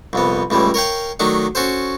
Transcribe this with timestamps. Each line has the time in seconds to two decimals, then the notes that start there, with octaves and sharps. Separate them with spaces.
0.13 C2 F2 B3
0.50 C#2 A2 E3 G3
0.74 A#4 C#5 F5 G5
1.20 D#3 F#3 A3 D4 D#4
1.55 C#4 F#4 A4 C5